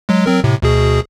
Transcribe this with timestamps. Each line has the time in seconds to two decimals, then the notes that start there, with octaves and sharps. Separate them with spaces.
0.09 F#3 G#3
0.26 F#3 C4 A#4
0.44 A2 C3
0.62 D2 B2 G#4